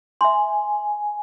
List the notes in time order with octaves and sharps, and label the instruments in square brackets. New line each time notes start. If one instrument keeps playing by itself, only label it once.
[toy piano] E5 C6 [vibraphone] G#5